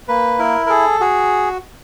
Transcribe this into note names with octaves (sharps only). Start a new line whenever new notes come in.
A#3 B4
E4 A#4
A#4
G#4 A4
F#4 G#4